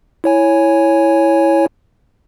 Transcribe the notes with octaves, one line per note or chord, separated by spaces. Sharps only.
E4 C#5 G#5